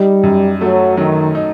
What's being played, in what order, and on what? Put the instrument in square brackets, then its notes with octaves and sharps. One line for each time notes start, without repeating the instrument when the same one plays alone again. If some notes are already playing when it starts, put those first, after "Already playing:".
Already playing: [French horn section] G3 [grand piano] D#4
[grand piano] F#2
[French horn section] F#3 [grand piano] A3
[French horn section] D#3 [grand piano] F#3
[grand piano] D#4